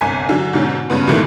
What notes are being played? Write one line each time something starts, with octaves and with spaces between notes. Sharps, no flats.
G1 C2 G#5 B6
D3 F#3
G#2 B2 D3 C#4
G2 C#3 B3
C#2 B2 D#3 E3 A3